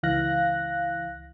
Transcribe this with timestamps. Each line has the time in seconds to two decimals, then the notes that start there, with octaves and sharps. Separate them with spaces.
0.03 C#2 E3 F5 F#6 A#6